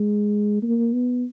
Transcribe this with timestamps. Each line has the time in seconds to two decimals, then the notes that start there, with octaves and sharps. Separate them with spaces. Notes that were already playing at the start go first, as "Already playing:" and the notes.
Already playing: G#3
0.63 A#3
0.93 B3